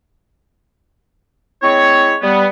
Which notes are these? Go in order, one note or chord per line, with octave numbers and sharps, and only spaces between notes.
G#3 C4 E4 C#5
G3 B3